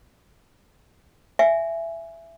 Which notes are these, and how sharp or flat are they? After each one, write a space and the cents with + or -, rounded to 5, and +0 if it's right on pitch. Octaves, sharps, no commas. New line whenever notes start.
E5 +15 G#5 +0